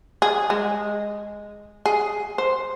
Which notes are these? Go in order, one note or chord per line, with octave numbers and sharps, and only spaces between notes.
G#4
G#3
G#4
C5